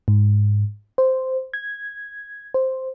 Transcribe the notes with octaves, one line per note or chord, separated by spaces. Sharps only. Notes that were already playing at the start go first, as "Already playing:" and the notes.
G#2
C5
G#6
C5